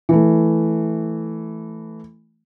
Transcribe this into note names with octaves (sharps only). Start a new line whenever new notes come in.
E3 A3